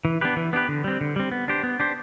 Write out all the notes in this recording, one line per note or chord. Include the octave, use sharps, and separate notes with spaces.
E3
B3 D4 G4 B4
E3
B3 D4 G4 B4
D3
G3 C4
D3
G3 C4
B3
D4 G4 C5
B3
D4 G4 C5